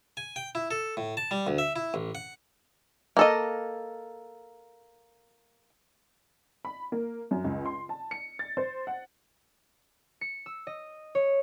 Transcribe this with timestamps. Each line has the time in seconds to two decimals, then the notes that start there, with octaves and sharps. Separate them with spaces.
0.17 G#5
0.36 G5
0.55 E4
0.71 A4
0.97 A2
1.17 A5
1.31 G3
1.47 D2
1.58 E5
1.76 E4
1.94 A1
2.15 F#5
3.17 A#3 A4 D#5
6.65 B5
6.92 A#3
7.31 F#2
7.44 C#2
7.66 C6
7.89 A5
8.11 C#7
8.39 A6
8.57 C5
8.87 F#5
10.21 C#7
10.46 E6
10.67 D#5
11.15 C#5